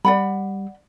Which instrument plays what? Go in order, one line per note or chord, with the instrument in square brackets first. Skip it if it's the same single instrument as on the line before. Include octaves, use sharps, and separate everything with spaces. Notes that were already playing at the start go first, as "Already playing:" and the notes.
[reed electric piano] G3 [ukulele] D5 F#5 B5